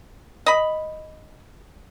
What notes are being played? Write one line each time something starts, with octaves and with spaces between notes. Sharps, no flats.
D#5 B5